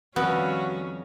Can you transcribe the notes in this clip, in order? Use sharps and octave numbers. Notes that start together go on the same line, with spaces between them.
F2 D#3 G3 B3 C#4 F#4